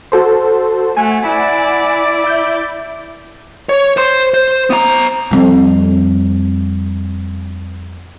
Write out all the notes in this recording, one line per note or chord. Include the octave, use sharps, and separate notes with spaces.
F#4 A4 C5
A3 F#5 G#5
E4 D5
E5 G6
C#5
C5 C6
C5
B3 A#5
F2 G3